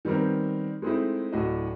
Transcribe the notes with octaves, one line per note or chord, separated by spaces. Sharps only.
D#3 G3 B3 C4 A#4
G#3 A3 C4 D#4 E4
D1 A2 D4 F#4 D#5